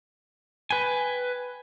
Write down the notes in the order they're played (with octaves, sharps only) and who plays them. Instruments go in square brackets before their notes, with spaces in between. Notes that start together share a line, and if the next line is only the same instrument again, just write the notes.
[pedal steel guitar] B4 G5 G#5